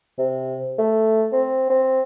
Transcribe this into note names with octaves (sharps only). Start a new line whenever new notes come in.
C3
A3
C4
C4